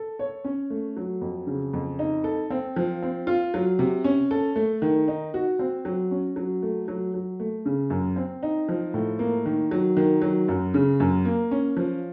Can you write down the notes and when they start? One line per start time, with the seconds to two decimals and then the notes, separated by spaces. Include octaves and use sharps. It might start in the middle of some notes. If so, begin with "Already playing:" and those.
Already playing: A4
0.19 C#5
0.44 C#4
0.70 A3
0.97 F#3
1.21 F2
1.47 C#3
1.73 F2
1.99 D#4
2.24 A4
2.50 C4
2.76 F3
3.02 C4
3.27 F4
3.54 F#3
3.79 C3
4.04 C#4
4.31 A4
4.56 A3
4.82 D#3
5.08 D#4
5.34 F#4
5.59 C4
5.85 F#3
6.11 C#4
6.36 F#3
6.63 A3
6.88 F#3
7.14 F#3
7.40 A3
7.66 C#3
7.90 F#2
8.16 C4
8.43 D#4
8.68 F3
8.94 A2
9.19 A#3
9.46 D#3
9.71 F#3
9.97 D#3
10.22 F#3
10.48 F#2
10.74 C#3
11.00 F#2
11.25 A#3
11.51 C#4
11.77 F3